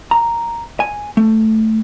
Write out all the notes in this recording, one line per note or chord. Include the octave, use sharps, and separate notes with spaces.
A#5
G#5
A3